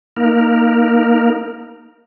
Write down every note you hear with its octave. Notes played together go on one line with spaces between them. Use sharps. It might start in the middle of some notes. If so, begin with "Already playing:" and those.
A#3 D#4 A#4